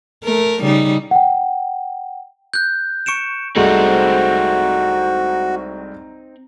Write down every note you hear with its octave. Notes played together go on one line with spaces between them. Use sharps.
A3 A#4
C#3 G3 D#4
F#5 G5
F#6 G6
C#6 C#7 D7 E7
C2 G#3 A3 C4 D#4 F#4